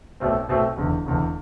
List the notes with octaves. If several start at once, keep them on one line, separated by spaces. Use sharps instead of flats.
B1 B2 A3 C4
B1 B2 A3 C4
F1 E2 D3
F1 E2 D3